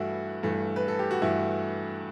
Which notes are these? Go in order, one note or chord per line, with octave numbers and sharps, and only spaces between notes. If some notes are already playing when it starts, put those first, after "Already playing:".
Already playing: G2 E3 A3 E4 F#4
G2 E3 A3
B4
A4
G4
F#4
G2 E3 A3 E4